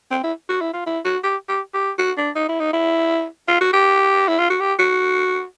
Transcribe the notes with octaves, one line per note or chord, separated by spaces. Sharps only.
C4
E4
F#4
E4
F4
E4
F#4
G4
G4
G4
F#4
D4
D#4
E4
D#4
E4
F4
F#4
G4
E4
F4
F#4
G4
F#4